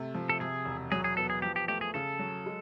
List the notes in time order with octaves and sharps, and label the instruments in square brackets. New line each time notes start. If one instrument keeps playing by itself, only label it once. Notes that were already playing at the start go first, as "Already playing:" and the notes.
Already playing: [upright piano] C3 A3
F3
[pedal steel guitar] A4
[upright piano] C3 [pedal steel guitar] G#4
[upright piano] E1
[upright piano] F#3 [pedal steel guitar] G#4
[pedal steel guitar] G#4
[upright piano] B3 [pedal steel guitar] A4
[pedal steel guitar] G#4
[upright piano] F3 [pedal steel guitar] G4
[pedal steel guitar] G4
[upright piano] A3 [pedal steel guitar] G4
[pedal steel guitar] G#4
[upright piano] C#3 [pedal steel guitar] A4
[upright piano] F#3
G#3